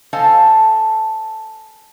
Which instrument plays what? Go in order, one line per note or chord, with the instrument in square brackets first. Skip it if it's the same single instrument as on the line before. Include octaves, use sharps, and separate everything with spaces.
[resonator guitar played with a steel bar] A4 C5 D#5 F5 G#5 A5